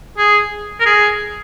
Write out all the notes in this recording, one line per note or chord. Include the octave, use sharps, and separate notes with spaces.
G#4
A#4
G#4